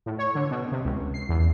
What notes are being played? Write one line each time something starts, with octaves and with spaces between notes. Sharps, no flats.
A2
C#5
D3
B2
C3
C#2
C7
E2